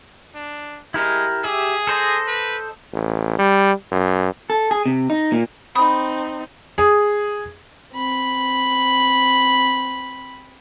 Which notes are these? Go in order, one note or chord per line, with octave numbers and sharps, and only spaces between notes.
D4
G#3 E4 G4 A#4
G4 G#4 E5
A4 C5 D#5
B4
A1
G3
F#2
A4
G#4
C3
D#4
A#2
C4 D#4 B5 D#6
G#4
C4 B5